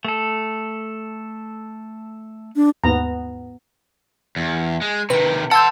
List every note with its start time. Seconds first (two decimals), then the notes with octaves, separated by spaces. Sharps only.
0.05 A3 A4
2.56 D4
2.84 D#2 G#2 B3 A#5
4.36 E2
4.81 G#3
5.10 C3 D#3 B4
5.51 F#5 A5 C6 E6 G6